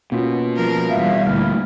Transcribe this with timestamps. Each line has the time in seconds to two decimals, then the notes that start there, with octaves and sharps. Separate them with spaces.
0.12 B2 A#3 C#4 F4
0.57 F3 A#4
0.89 E2 G3 E5 F5
1.27 D2 A#2 E4 F6